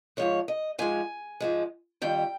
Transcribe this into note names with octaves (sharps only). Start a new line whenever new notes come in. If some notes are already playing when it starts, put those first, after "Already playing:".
G#2 F3 G#3 C#5
D#5
G#2 F3 G#3 G#5
G#2 F3 G#3
F2 D#3 G3 G5